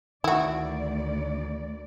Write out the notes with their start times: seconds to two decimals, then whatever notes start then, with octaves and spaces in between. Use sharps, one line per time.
0.24 D2 D#3 E4 F#4 D5